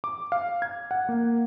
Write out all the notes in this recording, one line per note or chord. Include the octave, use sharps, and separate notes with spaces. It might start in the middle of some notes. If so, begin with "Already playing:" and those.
D6
F5
G#6
F#5
A#3